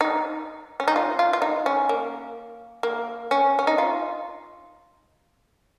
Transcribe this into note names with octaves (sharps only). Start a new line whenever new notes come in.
D#4
C#4
D#4
F4
F4
F4
D#4
C#4
A#3
A#3
C#4
C#4
D#4
F4